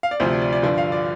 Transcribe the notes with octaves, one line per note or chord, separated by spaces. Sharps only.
F5
D5
D2 C3 F3 C5
D5
D5
D5
G2 D3 F3 D5
F5
D5